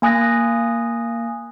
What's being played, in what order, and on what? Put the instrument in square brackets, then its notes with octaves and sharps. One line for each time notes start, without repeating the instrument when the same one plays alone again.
[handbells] A#3 G#5 D#6 F#6 A#6